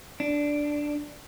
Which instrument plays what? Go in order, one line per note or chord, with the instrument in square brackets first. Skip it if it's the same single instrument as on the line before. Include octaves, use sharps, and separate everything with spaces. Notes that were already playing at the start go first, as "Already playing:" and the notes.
[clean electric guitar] D4